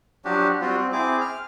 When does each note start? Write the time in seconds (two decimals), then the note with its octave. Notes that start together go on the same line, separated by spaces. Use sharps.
0.25 F3 F#3 D4 F#4 G4
0.61 G3 C4 F4 F#4
0.76 C4
0.93 C4 E4 G#4 D6
1.21 F6